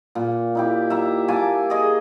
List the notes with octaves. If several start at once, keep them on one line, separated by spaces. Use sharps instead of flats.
A#2
D#4 E4 G4
E5 A#5
A#3 G#5 A5 D6
G#4 D#5